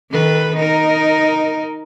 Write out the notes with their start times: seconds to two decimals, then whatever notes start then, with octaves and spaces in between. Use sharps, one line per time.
0.11 D#3 A4 B4
0.56 D#4 A#4